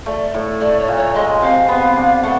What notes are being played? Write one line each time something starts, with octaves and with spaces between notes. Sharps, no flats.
A3 D5
A2
A3 D5
C#5
A#2
C#5
G#3 D#5
C3 F5
B3
D4
A3 F#5